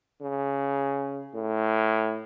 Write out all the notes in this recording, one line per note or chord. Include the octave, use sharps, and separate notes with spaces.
C#3
A2